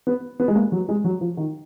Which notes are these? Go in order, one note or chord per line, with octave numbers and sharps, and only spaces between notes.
B3
B3
G#3
A#3
F#3
G#3
F#3
F3
D#3